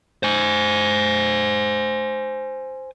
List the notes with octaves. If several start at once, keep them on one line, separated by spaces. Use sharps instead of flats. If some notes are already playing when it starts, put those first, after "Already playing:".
C5 G#5